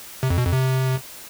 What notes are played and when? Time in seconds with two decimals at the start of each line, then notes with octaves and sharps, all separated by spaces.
0.23 C3
0.30 F2
0.38 B2
0.45 F2
0.53 C3